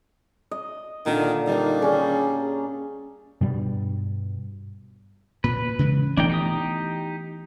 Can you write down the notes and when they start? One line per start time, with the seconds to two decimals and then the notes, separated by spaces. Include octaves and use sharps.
0.51 D#5
1.06 A#2 D3 D#3
1.47 D#3 G3 D4 F5
1.82 C#4 D4 G#4
3.41 G2 B2 G3
5.44 A#2 B4
5.79 C#3 E3 G#3
6.17 E3 A3 B3 D4 D#4 G5
6.29 D#4 G4 D#6